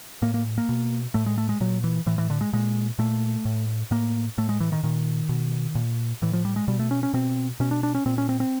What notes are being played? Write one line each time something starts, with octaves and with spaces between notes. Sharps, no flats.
A2 A#3
A#3
A#3
B2
A2 A3
G#3
A3
G#3
A#2 F#3
E3
A2 E3
E3
D3
G#3
A#2 G#3
A#2 A3
A2
A2 A#3
A2 A3
G#3
E3
D#3
A#2 D#3
B2
A#2
A2 E3
F3
G3
G#3
B2 G3
A3
C#4
C#4
B2 C4
B2 C#4
D4
D4
C#4
A#2 C4
C#4
C4
C4